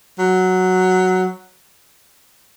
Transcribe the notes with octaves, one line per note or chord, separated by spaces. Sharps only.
F#3